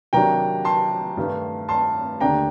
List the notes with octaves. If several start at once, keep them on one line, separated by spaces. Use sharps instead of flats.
C3 D#3 F#3 A#3 D4 G5 A#5
A5 C6
G2 D#3 A3
A5 C6
D#2 D3 A3 D4 G5 A#5